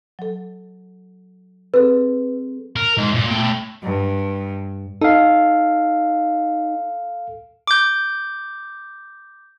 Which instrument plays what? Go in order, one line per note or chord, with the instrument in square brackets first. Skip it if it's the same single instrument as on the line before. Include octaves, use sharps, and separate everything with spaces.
[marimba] F#3 A4
[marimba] C4 G#4 A4 [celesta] B4
[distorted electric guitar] A#4
G#2
A#2
A3 G5
[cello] G2
[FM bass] D#4 [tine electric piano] A4 F5
[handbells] D6 G6